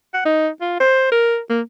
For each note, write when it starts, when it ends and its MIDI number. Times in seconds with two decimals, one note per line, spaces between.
0.14 0.23 78
0.25 0.48 63
0.61 0.78 65
0.80 1.07 72
1.12 1.38 70
1.49 1.61 58